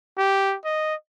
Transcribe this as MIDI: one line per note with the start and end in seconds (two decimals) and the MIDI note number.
0.18 0.56 67
0.65 0.95 75